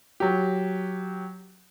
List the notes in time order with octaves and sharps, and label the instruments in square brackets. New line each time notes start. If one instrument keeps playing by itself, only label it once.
[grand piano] F#3 G4